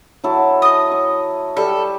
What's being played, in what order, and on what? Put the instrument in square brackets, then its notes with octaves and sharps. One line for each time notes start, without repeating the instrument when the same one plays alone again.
[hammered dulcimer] F#3 E4 A4
[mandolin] D#5 D#6
[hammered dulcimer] C#6
[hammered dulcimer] G3 [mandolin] A4